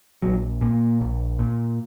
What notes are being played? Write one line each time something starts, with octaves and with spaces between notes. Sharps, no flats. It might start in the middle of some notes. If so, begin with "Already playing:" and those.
A#1 F#3
A#2 A#3
A#1
A#2